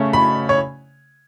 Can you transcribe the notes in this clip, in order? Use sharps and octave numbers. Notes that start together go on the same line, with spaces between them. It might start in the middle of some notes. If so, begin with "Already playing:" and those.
Already playing: C#3 A3 C#4
B5
C#5